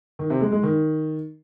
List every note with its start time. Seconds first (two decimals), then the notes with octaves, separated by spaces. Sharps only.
0.19 D#3
0.30 C3
0.41 G#3
0.52 G#3
0.63 D#3